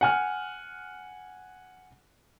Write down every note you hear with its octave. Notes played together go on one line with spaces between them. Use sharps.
F#5 G#5 F6